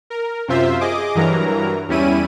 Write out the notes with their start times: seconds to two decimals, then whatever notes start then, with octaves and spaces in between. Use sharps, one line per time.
0.10 A#4
0.48 F#2 C3 F4 C5 E5
0.81 G#4 D#5 D6
1.15 G2 E3 F#3 A#4 A#5
1.89 E2 G3 C#4 E4 D#7